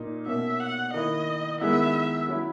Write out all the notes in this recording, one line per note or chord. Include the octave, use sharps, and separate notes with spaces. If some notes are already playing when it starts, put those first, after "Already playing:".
Already playing: A#2 A#3 D#4
B2 A#3 C#4 E5
F#5
D#3 A#3 E4 D#5
D#3 G#3 B3 E4 E5
F#3 C#4 E4